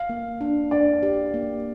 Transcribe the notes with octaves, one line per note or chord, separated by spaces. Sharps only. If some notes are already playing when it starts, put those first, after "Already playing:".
Already playing: F5
A#3
D4
D4 D5
G4
A#3